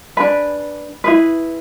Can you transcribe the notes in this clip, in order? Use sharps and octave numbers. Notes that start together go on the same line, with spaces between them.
D4 G#4 B4 B5
E4 G#4 B4